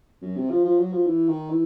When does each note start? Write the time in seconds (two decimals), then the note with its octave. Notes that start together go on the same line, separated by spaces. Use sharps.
0.22 F#2
0.36 C3
0.50 F3
0.65 F3
0.79 F#3
0.93 F3
1.07 E3
1.29 D#3
1.50 E3